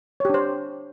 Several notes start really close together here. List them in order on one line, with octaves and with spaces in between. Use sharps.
C#5 G4 D4 C5